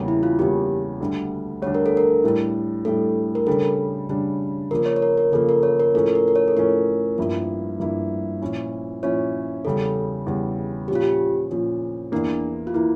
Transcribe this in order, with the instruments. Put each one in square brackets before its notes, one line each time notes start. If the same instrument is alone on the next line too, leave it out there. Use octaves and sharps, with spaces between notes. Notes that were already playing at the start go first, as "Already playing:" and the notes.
Already playing: [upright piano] E2 C#3 G3 A#3
[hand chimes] E4
F4
[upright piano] E2 C#3 G3 A#3 [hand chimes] G4
[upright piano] D2 D3 G3 D4
[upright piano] D2 D3 G3 D4 [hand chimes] C#5
[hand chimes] A#4
A4
A#4
[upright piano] A2 G3 D4
[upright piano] A2 G3 D4 [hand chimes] A4
[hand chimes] A#4
[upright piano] C#3 G3 D4 [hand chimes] A4
[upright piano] C#3 G3 D4
[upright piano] C#3 F3 A#3 [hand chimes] A#4
[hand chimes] C#5
C#5
A#4
A#4
[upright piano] C#3 F3 A#3 [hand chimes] A4
[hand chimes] A#4
C#5
A#4
[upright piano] A2 F3 C#4 [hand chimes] A4
[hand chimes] A#4
A#4
C#5
A4
[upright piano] A2 F3 C#4 [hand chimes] A#4
[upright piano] G2 F3 A#3 E4
G2 F3 A#3 E4
A#2 F3 C#4 E4
[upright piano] A#2 F3 C#4 E4 [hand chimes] C#5
[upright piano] E2 C#3 G3 [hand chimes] A4
[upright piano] E2 C#3 G3
[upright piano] A#2 F3 C#4 [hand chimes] G4
[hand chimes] F4
G4
[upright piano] A#2 F3 C#4
[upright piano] E2 E3 A#3 [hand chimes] D4
[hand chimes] F4
[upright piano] E3 A#3 [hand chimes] E4